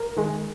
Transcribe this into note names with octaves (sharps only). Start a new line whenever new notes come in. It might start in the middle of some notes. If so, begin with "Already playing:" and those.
Already playing: A#4
D#3 G#3